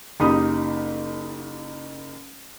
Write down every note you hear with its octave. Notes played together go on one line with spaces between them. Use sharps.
F#1 A#3 D#4 G4 B5 D#6